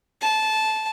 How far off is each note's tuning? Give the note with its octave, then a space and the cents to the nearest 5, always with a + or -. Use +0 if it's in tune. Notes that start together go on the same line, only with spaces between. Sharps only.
A5 -15